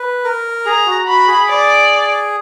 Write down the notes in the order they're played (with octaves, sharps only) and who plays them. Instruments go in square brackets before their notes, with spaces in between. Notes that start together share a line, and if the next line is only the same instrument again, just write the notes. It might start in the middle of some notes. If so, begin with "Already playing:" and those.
Already playing: [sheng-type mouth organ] B4
A#4
[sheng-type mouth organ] G#4 [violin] A#5
[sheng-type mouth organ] F#4
[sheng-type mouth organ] F#4 [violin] B5
[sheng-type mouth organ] G#4
[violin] D5